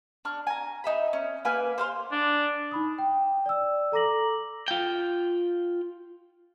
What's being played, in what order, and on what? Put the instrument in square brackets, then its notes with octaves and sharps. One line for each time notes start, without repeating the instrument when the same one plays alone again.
[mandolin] D4 C#6 F6
G#5 A#5
D#4 E5 B5
C#4
A#3 B4 G#5 F6
C5 F5 C6
[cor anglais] D4
[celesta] D#4 B5 D#6
G5
D5 E6
A4 A#5 D6 A#6 F#7
[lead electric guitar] F4 G5